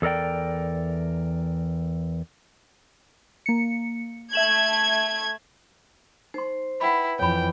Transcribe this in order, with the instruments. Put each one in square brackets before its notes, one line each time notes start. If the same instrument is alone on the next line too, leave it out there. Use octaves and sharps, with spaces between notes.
[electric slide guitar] E2 A4 A#4 D5 G5
[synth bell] A#3 C#7
[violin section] A3 G#6 [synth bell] E5 E7 F#7
[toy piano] D#4 C6 [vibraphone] C5
[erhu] E4 [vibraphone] B4 [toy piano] F#5 G5 B5
[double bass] F2 E3 [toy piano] C#5 B5 [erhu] G5